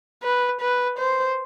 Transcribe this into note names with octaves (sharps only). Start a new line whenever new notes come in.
B4
B4
C5